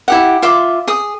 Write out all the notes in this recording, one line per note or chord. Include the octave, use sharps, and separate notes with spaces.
E4 G4 F#5
F4 E5 C6 D6
G#4 D#6